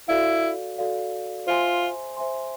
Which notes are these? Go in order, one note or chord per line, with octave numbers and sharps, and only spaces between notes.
E4 F#4 A4 D5 F5
F#4 A4 D5 F5
F4 C5 E5 G#5 C6
C5 E5 G#5 C6